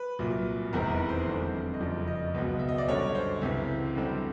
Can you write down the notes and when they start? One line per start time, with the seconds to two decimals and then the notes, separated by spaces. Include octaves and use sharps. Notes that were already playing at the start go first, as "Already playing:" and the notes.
Already playing: B4
0.19 C2 A#2 F#3
0.73 F1 E2 C3 D#3 G#3 A#4
0.91 B4
1.09 C5
1.26 F2 D3 G3 C4
1.74 D#5
1.80 F#1 F2 C#3 F3 D5
2.08 D#5
2.34 C#2 B2 F#3 B3
2.59 E5
2.69 D#5
2.78 D5
2.88 F#2 D3 G3 C#5
3.15 C5
3.41 C#2 C3 E3
3.96 F#2 D3 G3 C4